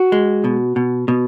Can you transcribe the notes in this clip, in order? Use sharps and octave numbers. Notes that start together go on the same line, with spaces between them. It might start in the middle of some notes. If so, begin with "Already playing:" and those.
Already playing: F#4
G#3
B2
B2
B2